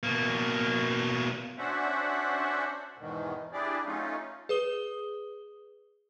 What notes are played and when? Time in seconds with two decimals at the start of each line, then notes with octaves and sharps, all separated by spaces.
0.03 B2 A#3
1.58 C#4 D4 F#4 C5 E5 F#5
2.98 E2 G#2 B2 D#3
3.52 D4 E4 G4 G#4 D5
3.85 F#3 A3 C#4 D#4 F4
4.49 G#4 B4 D#6 G7